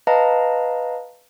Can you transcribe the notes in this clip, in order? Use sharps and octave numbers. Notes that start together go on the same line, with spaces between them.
B4 D#5 F5 A5 A#5